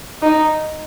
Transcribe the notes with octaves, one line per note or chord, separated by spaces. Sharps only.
D#4